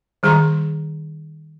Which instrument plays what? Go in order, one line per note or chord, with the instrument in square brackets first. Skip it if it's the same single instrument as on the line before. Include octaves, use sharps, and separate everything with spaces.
[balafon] D#3 G3 G#4 A#5 C6